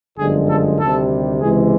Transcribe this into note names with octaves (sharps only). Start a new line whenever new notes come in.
G1 F#2 D3 F3 G#3 G#4
A4
D2 C3 D#3 G3 A4
C#2 C3 E3 G#3 G#4